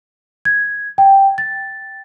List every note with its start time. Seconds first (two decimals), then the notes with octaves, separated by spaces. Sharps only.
0.45 G#6
0.98 G5
1.38 A6